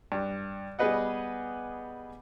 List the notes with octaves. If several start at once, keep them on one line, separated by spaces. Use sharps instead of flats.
G2
G3 B3 G#4 B4 D#5 F#5